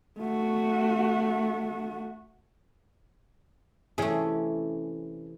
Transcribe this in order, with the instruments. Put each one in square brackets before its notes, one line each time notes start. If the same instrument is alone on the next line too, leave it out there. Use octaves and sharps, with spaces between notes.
[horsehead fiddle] A3 F#4
[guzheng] C3 A3 [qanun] E3 [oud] C#4 G#4